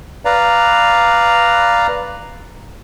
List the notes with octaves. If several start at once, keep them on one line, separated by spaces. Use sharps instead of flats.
B4 D5 F5 A#5